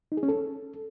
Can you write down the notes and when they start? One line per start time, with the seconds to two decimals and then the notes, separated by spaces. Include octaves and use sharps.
0.12 D#4
0.17 G#4
0.23 C#4
0.28 A4